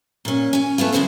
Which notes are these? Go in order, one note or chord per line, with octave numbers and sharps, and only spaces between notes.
A#2 C#4
C#4 G#5
A3 B3 E4 F4
F#2 A#2 C#3 E4 F#4 C5